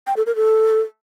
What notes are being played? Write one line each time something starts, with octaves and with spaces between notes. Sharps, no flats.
G5
A4
A#4
A4